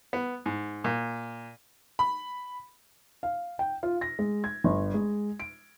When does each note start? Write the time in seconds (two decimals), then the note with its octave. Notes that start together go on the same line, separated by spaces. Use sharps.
0.13 B3
0.46 G#2
0.84 A#2
1.99 B5
3.23 F5
3.59 G5
3.83 F4
4.01 A#6
4.19 G#3
4.44 G#6
4.64 G1
4.94 G#3
5.40 D7